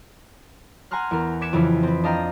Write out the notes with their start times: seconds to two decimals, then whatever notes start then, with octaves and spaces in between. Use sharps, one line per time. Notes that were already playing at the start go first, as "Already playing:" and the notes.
0.91 F#5 G#5 A#5 C6 F6 F#6
1.11 E2 A#4
1.41 D6 F#6 G#6 B6 C#7 E7
1.53 F2 C#3 E3 E4
1.83 C4 B4
2.04 D4 D#5 F5 G5 A#5